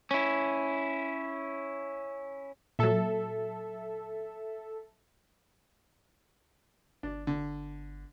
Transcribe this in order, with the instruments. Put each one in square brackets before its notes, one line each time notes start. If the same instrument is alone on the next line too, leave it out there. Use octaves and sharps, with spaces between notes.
[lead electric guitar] C#4 E4
[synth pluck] A#2 F#3 [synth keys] A4 E5
[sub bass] G1 [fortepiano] D4
[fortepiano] D3